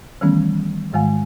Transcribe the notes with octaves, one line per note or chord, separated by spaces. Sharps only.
D#3 E3 G3 A3 B3 C#4
G#2 D#3 G#3 F5 G#5